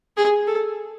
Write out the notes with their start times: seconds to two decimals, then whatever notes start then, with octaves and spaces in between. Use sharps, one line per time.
0.17 G#4
0.47 A4